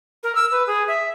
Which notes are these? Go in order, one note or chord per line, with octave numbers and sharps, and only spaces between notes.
A#4
E6
B4
G#4
E5